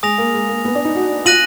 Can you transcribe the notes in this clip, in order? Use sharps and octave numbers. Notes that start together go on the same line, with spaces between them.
G#3 G#5 D#6 A#6 F7
A#3
G#3
A#3
B3
D4
D#4
F#4
F4 F#6 A#6 D#7 F#7